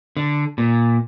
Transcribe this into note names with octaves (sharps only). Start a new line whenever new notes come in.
D3
A#2